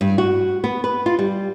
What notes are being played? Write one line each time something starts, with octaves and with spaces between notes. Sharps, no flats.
G2
F#4
B3
B4
F4
G3